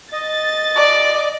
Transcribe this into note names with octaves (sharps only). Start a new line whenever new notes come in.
D#5 A6
D5